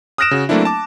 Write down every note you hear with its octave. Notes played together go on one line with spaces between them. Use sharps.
D#6 F6 F#6 A#6 D7 E7
C#3 F#4
F#3 A3 A#3 C4 D4 E4
A5 D6